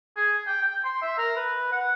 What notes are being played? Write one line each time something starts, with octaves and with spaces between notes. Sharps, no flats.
G#4
G5
G5
C6
E5
A#4
B4
F#5